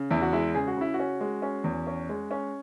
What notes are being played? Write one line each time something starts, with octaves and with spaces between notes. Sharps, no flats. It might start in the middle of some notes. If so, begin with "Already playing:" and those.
Already playing: C#3
E2 E4
F#4
G#3 E4
C#3 G#4
F#4
C#3 E4
F#4
C#4
G#3
C#4
E2
C#4
G#3
C#4